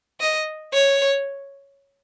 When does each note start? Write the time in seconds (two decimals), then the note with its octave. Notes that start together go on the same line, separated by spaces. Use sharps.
0.20 D#5
0.73 C#5